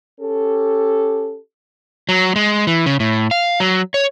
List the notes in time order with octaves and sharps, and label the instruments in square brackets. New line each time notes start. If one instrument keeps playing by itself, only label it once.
[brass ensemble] C#4 G4 A4
[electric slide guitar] F#3
G#3
E3
C#3
A2
F5
F#3
C#5